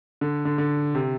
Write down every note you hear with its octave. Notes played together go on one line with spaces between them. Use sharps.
D3
D3
D3
C3